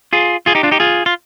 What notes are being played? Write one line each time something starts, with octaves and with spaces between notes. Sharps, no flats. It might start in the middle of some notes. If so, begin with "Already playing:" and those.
F4 G#4
F4 G#4
D#4 G4
D4 F4
D#4 G4
F4 G#4
F4